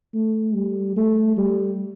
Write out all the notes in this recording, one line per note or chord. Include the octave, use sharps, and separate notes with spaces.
A3
G3
A3
G3